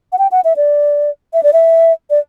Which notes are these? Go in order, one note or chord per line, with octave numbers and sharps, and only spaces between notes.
F#5
G5
F#5
E5
D5
E5
D5
E5
D5